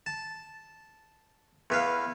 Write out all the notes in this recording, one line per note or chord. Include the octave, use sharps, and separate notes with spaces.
A5
E2 B3 F5